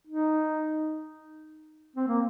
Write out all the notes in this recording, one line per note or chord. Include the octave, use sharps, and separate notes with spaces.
D#4
C4
A#3